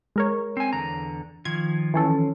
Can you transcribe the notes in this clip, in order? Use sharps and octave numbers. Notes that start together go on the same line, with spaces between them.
G#3 A#4 C#5
C4 G#5
E2 D3 A#5
D#3 F3 G#6
E3 C#4 A4